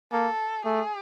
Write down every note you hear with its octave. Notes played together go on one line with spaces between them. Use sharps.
A#3 A4
A3 G#4